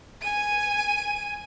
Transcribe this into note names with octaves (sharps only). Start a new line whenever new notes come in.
G#5 D#7